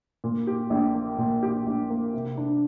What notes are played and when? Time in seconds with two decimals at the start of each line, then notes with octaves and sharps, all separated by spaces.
0.24 A#2
0.47 G4
0.70 A#1
0.94 A#3
1.18 A#2
1.43 G4
1.66 A#1
1.90 A#3
2.14 C3
2.37 D4